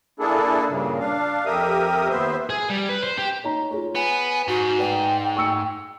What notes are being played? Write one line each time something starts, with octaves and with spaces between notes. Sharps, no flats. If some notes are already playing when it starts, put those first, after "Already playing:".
A#3 D4 E4 G#4 A4
G2 A#2 C#3
D4 F5
F2 G4 A#4 E5 D#6
D#2 B3 C5 E5
G#4
G3
B4
C5
G4
D#4 C#5 A#5
F4 G#4 C#5
B3 G#5
G#2 F#4
B4 D5 G5
C#6 E6 C#7